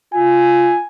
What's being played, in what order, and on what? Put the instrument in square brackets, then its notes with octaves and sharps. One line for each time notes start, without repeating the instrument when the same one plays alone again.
[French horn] F4 [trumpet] G#5